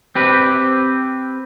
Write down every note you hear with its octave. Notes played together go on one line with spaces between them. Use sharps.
C4 G4 B4